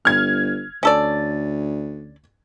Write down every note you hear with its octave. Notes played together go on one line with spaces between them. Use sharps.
G1 F6 G#6
D2 C#4 A4 D5